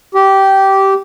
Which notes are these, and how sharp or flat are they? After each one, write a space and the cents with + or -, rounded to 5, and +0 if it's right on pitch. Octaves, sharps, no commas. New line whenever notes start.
G4 -15